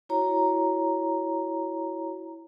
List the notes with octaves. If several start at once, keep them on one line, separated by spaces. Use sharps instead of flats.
E4 F#4 C#5 A#5